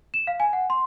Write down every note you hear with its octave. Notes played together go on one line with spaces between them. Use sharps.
E7
F5
G#5
F#5
C6